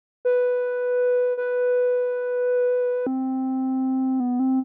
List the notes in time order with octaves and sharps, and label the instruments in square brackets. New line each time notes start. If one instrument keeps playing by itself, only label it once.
[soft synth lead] B4
B4
C4
B3
C4